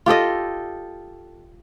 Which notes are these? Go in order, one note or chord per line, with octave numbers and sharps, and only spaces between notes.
F4 G4 A4 D#5